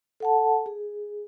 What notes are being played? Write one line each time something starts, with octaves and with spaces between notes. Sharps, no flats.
A4 F#5 A5
G#4